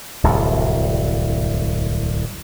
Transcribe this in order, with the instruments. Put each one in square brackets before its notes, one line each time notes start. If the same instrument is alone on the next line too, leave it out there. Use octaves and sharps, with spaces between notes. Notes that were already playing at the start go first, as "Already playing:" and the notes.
[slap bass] D1 C2 F2